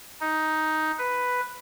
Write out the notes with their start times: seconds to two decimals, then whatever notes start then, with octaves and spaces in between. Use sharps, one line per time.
0.21 D#4
0.98 B4